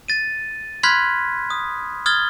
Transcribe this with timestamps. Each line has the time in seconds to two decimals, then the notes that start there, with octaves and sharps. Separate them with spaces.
0.08 A6 D#7
0.83 B5 C6 F6 F#6 G#6 B6
1.50 D#6
2.06 D#6 F6 G#6 A6 G7